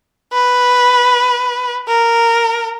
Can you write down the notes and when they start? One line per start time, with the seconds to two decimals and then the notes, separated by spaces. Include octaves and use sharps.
0.33 B4
1.88 A#4